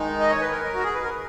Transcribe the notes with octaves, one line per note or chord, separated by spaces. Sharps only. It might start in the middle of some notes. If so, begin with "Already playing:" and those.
Already playing: D#3 G#3 D#4
D#5
C#5
B4
A#4
F#4
G#4
B4
A#4